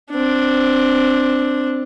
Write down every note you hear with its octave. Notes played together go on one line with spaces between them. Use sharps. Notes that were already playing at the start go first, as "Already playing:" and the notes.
C4 D4